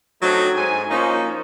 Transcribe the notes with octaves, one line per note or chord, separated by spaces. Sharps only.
F#3 A3 C4 D4 D#4
G#2 G#5
F3 A#3 C#4 D#4